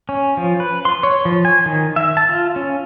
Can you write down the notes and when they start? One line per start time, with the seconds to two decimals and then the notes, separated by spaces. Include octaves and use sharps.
0.09 C#4
0.37 F3
0.60 B4
0.85 C6
1.03 C#5
1.25 F3
1.45 G#5
1.66 D#3
1.96 E5
2.17 A5
2.29 F4
2.56 C#4